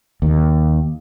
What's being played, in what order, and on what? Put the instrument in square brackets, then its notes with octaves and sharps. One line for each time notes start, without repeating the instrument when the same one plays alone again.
[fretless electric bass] D#2